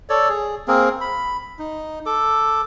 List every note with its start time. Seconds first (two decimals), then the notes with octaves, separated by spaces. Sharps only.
0.10 A4 C#5 D5
0.29 G#4
0.68 A#3 C4 G#4 A#4
1.01 B5
1.59 D#4
2.06 A4 D6